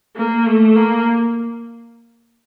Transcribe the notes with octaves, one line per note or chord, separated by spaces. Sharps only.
A#3
A3
A#3